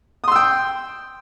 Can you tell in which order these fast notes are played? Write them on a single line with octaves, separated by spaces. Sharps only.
D#6 C6 E6 G5